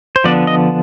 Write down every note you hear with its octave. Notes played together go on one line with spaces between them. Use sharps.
C5
D3 F3 B3 D4 D5
D#5